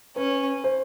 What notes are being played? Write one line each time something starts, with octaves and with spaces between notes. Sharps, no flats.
C#4 B4
C5